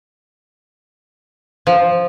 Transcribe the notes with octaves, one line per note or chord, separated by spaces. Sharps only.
F3